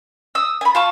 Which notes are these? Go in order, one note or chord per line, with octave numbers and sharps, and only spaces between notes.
D#6 E6
G#5 B5
F4 A5 C#6